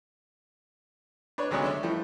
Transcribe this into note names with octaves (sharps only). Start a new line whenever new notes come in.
D4 B4 C#5
D2 D3 F#3 G#3 B3 C#4
C#4 D4 E5
E3 F3 G3 A3